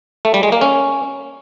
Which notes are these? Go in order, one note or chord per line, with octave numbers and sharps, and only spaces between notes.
A3
G3
G#3
A#3
C#4